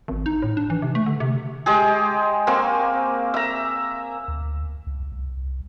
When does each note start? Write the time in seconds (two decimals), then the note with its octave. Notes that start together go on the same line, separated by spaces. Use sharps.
0.08 G#1
0.26 D#4
0.42 A2
0.57 D4
0.70 E3
0.82 C3
0.95 A3
1.06 D3
1.20 C3
1.66 G#3 G4 G#4
2.47 A#3 C4 G#5 C#6
3.34 E5 A#5
4.28 D2
4.87 C#2
5.12 C2